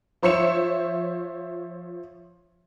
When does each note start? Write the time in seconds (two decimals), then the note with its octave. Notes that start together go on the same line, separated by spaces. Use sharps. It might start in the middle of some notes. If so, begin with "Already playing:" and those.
0.22 F3 C5 C#5 E5 C#7 E7